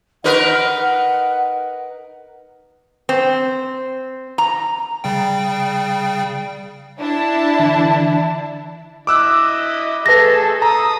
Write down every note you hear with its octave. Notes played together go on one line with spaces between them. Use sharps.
D#4 A#4 B4 F#5
C4
A#5
C#3 G3 G5
D4 E4 A5
D3 E3
E4 D#5 D6 E6 F#6
A3 G#4 A4 B4 A#6
A4 A5 A#5 D#6